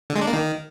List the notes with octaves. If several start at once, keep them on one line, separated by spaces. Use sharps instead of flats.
D3
G#3
D4
A#3
D#3